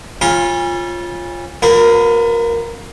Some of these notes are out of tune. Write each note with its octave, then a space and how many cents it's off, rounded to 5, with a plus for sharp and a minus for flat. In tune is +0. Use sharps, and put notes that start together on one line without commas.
C#4 -30 F4 +0 B5 -35
A#3 +0 F4 +45 B4 +30